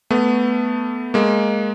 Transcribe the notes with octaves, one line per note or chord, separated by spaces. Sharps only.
A3 B3
G#3 A#3